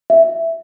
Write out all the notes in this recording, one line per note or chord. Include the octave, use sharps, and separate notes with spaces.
E5